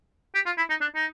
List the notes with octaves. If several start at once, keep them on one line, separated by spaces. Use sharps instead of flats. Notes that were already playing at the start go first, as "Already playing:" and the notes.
G4
F4
E4
D#4
D4
D#4